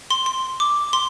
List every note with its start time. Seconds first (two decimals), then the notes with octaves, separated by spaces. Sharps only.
0.10 C6
0.26 C6
0.60 D6
0.93 C6